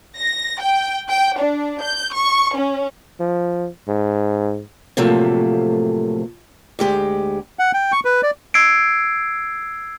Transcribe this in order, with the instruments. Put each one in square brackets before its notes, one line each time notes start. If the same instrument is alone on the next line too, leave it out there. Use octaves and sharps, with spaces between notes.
[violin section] A#6
G5
G5
D4
G6
C#6
C#4
[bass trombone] F3
G#2
[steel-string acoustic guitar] A2 C3 F3 F#3 A3 A#3
D2 G#3 G4
[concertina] F#5
G5
C#6
B4
D5
[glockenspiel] E6 G#6 C7 D7